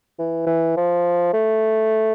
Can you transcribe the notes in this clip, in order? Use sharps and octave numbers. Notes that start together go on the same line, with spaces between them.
E3
E3
F3
A3